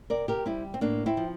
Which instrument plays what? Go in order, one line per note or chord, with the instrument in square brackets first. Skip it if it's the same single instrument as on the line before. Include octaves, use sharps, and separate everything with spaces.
[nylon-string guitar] C3 A#4 D5
G4 A#4
G3 C4 E4
C4
A2 A#3 D4
C4 E4
F3